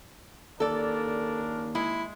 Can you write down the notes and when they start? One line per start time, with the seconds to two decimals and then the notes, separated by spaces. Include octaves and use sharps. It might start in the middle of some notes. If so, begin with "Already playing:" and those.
0.60 D#2 C#3 D4 A4 A#4 D5
1.75 G#3 E4